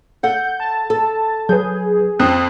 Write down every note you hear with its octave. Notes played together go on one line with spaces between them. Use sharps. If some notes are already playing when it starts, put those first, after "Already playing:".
A4 F#5 G6
A5
A4
F#3 G#4 B4 G6
F2 C4 D#6 F#6